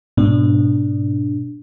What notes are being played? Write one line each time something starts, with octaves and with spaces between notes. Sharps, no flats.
G#2 B2 D4